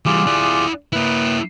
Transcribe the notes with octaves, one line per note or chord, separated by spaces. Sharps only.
E3 G3 F4 G4 G#4
E4 D5
A#3 E4 B4